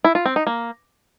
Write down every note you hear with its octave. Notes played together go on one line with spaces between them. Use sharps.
E4
F4
C4
D#4
A#3